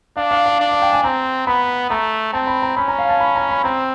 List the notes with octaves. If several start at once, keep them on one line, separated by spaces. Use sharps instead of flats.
D4 F5
F5
F5
D4
F5
G5
G#5
C4 A#5
B3 B5
A3 A#5
C4 A5
B5
A#5
C#4 B5
A#5
F5
A5
B5
A#5
B5
C4 A#5